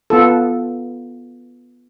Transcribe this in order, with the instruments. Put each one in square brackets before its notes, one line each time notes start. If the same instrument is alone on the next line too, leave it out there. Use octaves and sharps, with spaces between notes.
[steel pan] B3 F4 A4